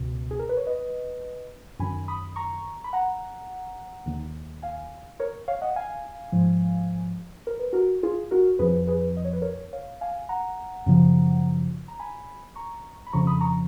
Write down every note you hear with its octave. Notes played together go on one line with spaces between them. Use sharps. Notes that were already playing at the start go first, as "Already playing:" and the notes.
Already playing: C#2 B2
G#4
A#4
B4
C#5
B4 D#5
F#2 D#3 G#5 B5
B5 D#6
A#5 C#6
B5
F#5 A#5
D#2 D#3
F5 G#5
A#4 C#5
C#5 F5
D#5 F#5
F5 G#5
G#2 F3
A#4
B4
F#4 A#4
F4 G#4
F#4 A#4
F2 F3 G#4 B4
G#4 B4
D#5
C#5
B4
A#4 C#5
C#5 F5
F5 G#5
F#5 A#5
F#2 C#3 F3
A#5
G#5 B5
A#5 C#6
B5
F2 C#3 F3 A#5 C#6
B5 D#6
A#5 C#6